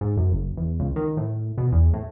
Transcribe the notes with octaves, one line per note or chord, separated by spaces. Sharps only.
G#2
F#2
F#1
E2
C#2
D#3
A2
B2
E2
A2